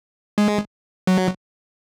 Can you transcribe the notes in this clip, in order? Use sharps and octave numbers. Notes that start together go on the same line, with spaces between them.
G#3
F#3